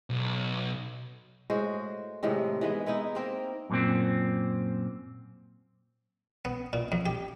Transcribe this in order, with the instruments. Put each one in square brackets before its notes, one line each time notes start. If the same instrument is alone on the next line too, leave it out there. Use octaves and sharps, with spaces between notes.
[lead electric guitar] B1
[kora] A2 G#3 F#4 C5
A2 C3 D#3 G#3
E3 G#3 B3
G#3 B3 D#4 E4
A#3 C4 A#4
[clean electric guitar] F#2 A#2 C4
[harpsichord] B3
A#2
F2
G4